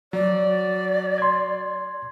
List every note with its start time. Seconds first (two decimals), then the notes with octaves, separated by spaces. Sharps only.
0.13 F#3 D5
1.18 C6 G#6